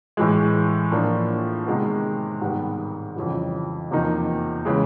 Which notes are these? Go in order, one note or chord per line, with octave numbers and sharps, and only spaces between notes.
A2 E3 G#3
A2 F3 A#3 D4 F4
C3 D#3 G#3 B3
G#2 D#3 G3 B3
F2 C#3 E3 G3
E2 C3 F3 A#3 D#4
C#3 E3 G#3